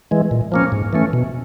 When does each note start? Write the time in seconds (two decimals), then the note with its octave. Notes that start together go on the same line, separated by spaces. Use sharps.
0.11 E3 G#3
0.31 A#2
0.52 F3 A#3 C#4
0.72 G#2
0.93 E3 A3 C#4
1.13 B2